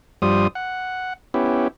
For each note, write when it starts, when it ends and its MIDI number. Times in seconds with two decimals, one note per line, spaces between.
0.22 0.47 43
0.22 0.47 53
0.22 0.47 55
0.22 0.47 72
0.22 0.47 87
0.55 1.13 78
1.34 1.68 59
1.34 1.68 61
1.34 1.68 64
1.34 1.68 67